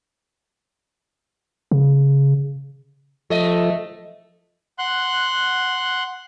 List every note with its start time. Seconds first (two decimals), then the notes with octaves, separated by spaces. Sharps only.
1.71 C#3
3.30 F3 A3 A4 D#5
4.79 F#5 C6 F#6